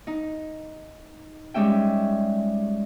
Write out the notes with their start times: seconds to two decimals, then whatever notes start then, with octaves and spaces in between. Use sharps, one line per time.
0.07 D#4
1.54 G3 G#3 C#4 E5 G5